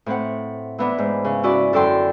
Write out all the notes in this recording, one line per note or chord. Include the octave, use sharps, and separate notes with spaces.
A2 C4 F#5
E3 B3 D4
G#2
C#3
C#4 E4 F#4 D5
F#2 D3 A4 D5 G5 C6